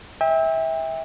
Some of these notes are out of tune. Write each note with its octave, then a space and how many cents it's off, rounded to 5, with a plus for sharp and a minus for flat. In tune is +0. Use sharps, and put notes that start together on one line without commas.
E5 -25 G5 +30